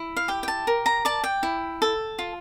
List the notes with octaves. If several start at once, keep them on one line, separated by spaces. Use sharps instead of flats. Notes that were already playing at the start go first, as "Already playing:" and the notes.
Already playing: E4
F5
G4 G5
G5
A5
A#4
A#5
D5 A5
G5
E4
A4
F4